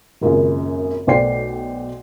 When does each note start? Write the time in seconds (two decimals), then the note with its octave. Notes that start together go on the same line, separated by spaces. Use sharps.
0.21 G#1 F#2 A#2 C#3
1.07 B1 A3 C5 D5 G5 C7